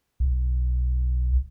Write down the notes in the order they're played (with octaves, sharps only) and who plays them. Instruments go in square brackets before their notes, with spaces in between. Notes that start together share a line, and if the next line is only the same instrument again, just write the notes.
[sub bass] B1